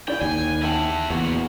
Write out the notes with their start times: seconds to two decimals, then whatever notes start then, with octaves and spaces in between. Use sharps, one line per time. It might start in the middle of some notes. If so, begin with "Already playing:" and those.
0.08 E4 D5 F5 G5
0.22 D#2 G4 G#5
0.63 E4 F#5 G5 A5
1.10 E2 A#2 F#4